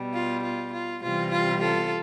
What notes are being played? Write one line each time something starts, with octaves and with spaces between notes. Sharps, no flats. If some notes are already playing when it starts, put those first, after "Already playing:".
Already playing: B2 G3
F4
F4
F4
C3 E3 G3 F4
F4
F4 A4